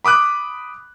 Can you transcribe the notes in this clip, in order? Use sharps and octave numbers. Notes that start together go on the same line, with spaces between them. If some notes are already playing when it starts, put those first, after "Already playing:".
B5 D6 D#6 F#6